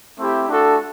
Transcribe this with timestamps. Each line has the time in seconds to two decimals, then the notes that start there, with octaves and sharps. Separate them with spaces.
0.19 A3 C4 E4 G4
0.48 A3 D4 F#4 A4